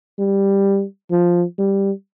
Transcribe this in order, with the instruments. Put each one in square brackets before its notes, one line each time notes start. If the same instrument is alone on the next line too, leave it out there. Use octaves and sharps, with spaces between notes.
[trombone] G3
F3
G3